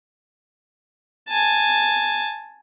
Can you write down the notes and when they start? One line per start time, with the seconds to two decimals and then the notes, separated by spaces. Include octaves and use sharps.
1.29 G#5 A5